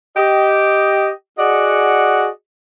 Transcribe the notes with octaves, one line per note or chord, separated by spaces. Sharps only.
G4 D#5
F#4 G#4 D5 D#5 F#5